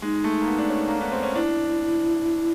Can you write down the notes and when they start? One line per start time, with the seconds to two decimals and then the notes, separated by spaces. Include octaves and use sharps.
0.02 G#3 D#4
0.24 A3
0.42 A#3
0.47 B3
0.59 D4
0.69 C#4
0.88 A#3
1.01 B3
1.12 C4
1.23 C#4
1.35 D4 E4